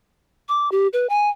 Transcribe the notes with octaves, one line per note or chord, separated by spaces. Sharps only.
D6
G4
B4
G#5